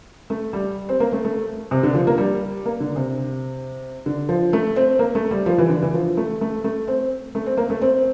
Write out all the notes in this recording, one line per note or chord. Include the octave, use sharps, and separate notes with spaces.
A3
G3
C4
A#3
A3
A3
C3
D3
F3
A#3
G3
A#3
D3
C3
D3
F3
A3
C4
A#3
A3
G3
F3
E3
D3
E3
F3
A3
A3
A3
C4
A3
C4
A#3
A3
C4